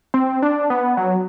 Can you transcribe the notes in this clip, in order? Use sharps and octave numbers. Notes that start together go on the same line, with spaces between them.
C4
D4
B3
F#3